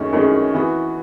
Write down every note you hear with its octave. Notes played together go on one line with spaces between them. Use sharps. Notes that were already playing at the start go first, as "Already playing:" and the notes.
Already playing: F#2 D#3 A3 C#4 G#4
F#2 D#3 A3 C#4 G#4
E3 B3 F#4